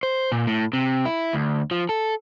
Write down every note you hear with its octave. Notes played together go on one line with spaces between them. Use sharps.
C5
A#2
A2
C3
E4
D2
F3
A4